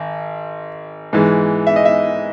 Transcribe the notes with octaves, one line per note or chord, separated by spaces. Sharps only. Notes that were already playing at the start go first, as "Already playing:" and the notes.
Already playing: G#1
G#2 E3 G#3
E5
D#5
E5